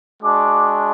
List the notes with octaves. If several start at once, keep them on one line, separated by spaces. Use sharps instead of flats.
G#3 D4 F#4 D6